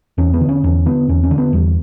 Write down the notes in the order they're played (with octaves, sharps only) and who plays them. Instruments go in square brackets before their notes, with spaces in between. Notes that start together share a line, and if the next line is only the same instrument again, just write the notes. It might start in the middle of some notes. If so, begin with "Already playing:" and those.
[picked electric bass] E2 C#4
B3
D3
C#4
E2 C#4
D3 B3
E2 C#4
C#4
D3
B3
E2 G3